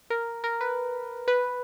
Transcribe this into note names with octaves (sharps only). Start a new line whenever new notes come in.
A#4
A#4
B4
B4